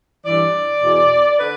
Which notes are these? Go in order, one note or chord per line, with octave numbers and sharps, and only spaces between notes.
G2 E3 D5
E2 B2
D3 B4